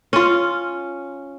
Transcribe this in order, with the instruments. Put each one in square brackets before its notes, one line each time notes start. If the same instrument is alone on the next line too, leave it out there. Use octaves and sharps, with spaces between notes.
[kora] C#4 F4